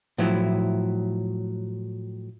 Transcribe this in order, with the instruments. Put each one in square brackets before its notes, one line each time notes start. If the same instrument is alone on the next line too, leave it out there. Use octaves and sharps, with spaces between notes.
[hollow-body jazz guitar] A2 F3 F#3 E4